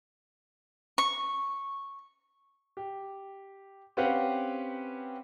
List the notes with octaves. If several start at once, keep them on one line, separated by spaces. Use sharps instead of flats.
C#6
G4
C4 C#4 G4 B4 F5 F#5